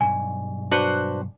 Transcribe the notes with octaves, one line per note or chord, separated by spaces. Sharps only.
B1 G2 G#5
D4 F#4 B4 C5